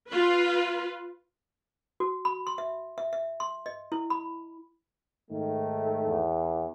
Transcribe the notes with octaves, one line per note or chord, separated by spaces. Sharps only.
F4 B4
F#4
B5
C6
E5
E5
E5
C6
D#5
E4
B5
G#2 D#3 A3
E2